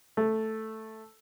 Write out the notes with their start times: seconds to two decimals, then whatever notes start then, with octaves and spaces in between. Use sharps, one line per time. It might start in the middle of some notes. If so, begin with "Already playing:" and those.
0.17 A3